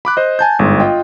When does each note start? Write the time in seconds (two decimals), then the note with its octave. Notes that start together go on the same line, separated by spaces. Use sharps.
0.05 B5 D6 F#6
0.17 C5 D#5
0.39 G#5 A5 G6
0.59 G1 G#2
0.80 F4 D#5 G5